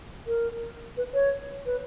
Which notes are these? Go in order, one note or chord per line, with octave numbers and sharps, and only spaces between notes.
A#4
B4
C#5
B4